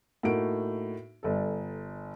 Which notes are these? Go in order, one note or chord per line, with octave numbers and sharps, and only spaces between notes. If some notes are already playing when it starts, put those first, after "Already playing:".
A2 A#3 D#4 F#4 D7
G1 A4